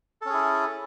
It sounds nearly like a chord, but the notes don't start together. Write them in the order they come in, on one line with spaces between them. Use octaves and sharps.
A4 C#4 G#4 E4